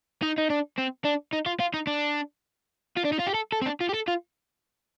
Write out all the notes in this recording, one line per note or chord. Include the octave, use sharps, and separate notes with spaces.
D#4
D#4
D4
C4
D4
D#4
F4
F4
D#4
D4
F4
D4
D#4
F4
G4
A4
A4
C4
D4
F4
G4
A4
F4